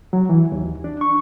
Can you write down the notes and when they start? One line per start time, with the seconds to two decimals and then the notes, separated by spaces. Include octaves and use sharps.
0.13 F#3
0.29 E3
0.52 D#2
0.84 D4
1.01 C#6